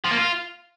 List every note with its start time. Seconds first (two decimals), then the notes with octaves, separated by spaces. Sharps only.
0.05 F3
0.11 A#3
0.17 F4